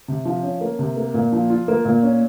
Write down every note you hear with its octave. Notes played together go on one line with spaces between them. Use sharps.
C3
F3
C#4
A#3
C3
A#3
A#2
F3
F4
A#3
A#2
C#4